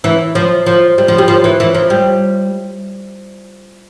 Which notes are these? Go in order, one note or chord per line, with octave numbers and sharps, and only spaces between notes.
E3
F3
F3
G3
F3
G3
F3
E3
E3
F3
G3